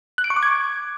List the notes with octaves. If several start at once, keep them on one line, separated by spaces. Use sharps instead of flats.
F#6
D7
C#6
D6
G#6